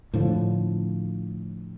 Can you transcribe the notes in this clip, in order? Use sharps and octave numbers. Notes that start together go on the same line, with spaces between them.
A2 D3 F3